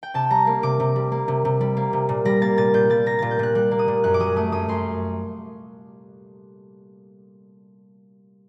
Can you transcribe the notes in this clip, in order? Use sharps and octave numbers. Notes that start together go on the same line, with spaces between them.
G5
C3 A5
G3 A#5
A#3
C3 D6
C3
G3
A#3
C3
C3
G3
A#3
C3
A#2
G3 A#6
A#3 A6
A#2 A6
A#2 G6
G3 A6
A#3 A#6
A#2 A6
G6
A#2 F#6
G3 F#6
A#3
D#6
A#2
F#2 F#6
D6
F#3 D#6
A3 D#6
F#2 D#6
F#2 C6